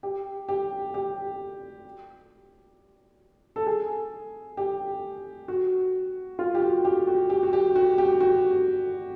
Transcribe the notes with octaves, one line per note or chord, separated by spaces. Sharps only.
G4
G4
G4
A4
G#4
G4
F#4
F4
G4
F#4
G4
F#4
G4
F#4
G4
F#4
G4
F#4